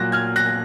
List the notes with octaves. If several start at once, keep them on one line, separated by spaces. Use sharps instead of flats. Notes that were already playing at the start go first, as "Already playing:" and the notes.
Already playing: A#2 F#3 F#6 A#6
F6 G#6
F#6 A#6